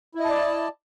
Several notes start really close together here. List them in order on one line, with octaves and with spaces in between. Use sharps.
E4 D#5 A5 D5